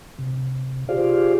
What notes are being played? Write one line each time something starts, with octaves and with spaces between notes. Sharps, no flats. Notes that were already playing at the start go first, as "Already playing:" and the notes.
C3
F4 G4 G#4 C5 D5 F5